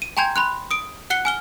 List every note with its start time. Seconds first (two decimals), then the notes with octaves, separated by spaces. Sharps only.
0.02 D#7
0.17 G5 G#5 A#5 C6 G6 G#6
0.36 B5 C6 F#6
0.71 D#6 D7
1.10 F#5 F#6 C#7 G7
1.25 G#5 F6 G7